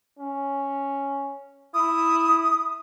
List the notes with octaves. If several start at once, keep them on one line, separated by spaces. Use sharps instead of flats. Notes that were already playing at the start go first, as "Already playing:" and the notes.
C#4
E4 D#6